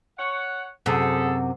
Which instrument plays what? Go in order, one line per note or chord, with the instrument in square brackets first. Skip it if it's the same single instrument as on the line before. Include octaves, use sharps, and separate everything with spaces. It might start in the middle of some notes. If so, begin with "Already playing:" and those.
[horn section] C#5 F#5
[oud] F#2 C3 [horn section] G#4 A4